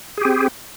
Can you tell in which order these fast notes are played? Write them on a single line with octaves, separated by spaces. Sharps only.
G#4 G4 C4